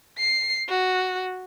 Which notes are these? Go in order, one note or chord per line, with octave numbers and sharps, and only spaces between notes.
C7
F#4